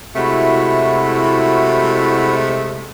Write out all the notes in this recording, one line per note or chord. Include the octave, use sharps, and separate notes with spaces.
C3 G#3 A3 E4 F#4